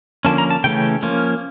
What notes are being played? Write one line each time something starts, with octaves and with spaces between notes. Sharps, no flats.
D3 F3 A#3 C#4 A5
A#5
A5
C#3 E3 A3 C#4 G5
F3 A#3 C#4